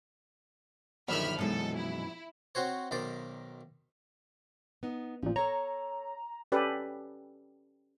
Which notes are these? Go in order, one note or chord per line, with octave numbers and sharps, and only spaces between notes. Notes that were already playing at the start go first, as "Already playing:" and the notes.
A#1 F#2 D3 D#3 E5 B5 F6
F#2 B2 E3 G#3 D#4 A4
E4
C4 F#4 C5 C#5
B1 D#3 C5 D5
B3 D#4
A1 A#2 F3
A4 C#5 A#5
C#4 G4 A4 B4 D5